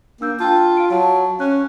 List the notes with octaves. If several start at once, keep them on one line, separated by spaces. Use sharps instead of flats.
A#3 D4 E6 G6
F4 G5 A5
F5 D7
F#3 F5 A5
C#4 F#6